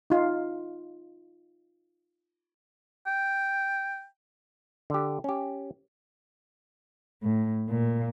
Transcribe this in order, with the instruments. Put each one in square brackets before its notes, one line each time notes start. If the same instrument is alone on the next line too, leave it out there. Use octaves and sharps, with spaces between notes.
[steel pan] D#4 F4
[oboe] G5
[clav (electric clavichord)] D3 G4
C#4 G4
[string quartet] A2
A#2